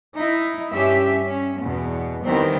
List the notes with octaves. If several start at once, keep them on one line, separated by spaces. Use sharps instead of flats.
D#4 E4
G2 C#4 G4 E5
C#4
E2 B2
D#3 E3 G3 B3 C4